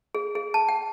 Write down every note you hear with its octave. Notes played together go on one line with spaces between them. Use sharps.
G#4
G#4
A5
G5